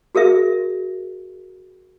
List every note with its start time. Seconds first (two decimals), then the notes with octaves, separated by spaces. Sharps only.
0.15 F#4 G#4 A#4 E5